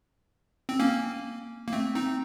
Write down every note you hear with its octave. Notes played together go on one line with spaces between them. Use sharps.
C4
A#3 C#4
A#3
A3 C4
C4 D#4